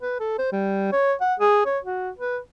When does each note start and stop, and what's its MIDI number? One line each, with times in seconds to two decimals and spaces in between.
0.01 0.19 71
0.20 0.38 69
0.39 0.51 72
0.52 0.90 55
0.92 1.13 73
1.21 1.34 78
1.39 1.61 68
1.66 1.79 73
1.84 2.10 66
2.19 2.39 71